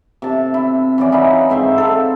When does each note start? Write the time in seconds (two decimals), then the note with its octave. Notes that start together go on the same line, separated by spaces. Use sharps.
0.22 C3 A5
0.54 E4
0.98 E3 C#4 F#4 D5
1.12 D#4 E4 F5 B5
1.50 G#2 C4 E5 C6
1.78 A4 F5